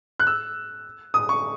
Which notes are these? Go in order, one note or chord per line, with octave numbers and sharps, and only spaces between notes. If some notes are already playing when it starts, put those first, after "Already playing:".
F#6
E6
D#6
C#6